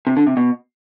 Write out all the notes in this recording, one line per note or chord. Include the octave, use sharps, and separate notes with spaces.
C3
D3
C3
B2